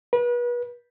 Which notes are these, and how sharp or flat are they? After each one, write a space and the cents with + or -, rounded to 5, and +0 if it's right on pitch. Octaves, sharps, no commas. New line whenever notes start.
B4 -35